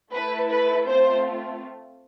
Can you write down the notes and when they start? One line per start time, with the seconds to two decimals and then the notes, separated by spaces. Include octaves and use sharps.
0.13 A3 E4 A4 B4
0.50 B4
0.88 A3 C4 F4 C5